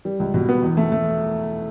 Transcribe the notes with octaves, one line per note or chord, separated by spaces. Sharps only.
G3
C#2
B2
B3
E2
A3
A3